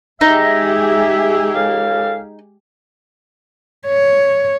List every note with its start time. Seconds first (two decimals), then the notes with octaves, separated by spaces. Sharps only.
0.21 G#3 D#4 G4 G#4 E5
1.55 C#2 A4 F5
3.87 C#5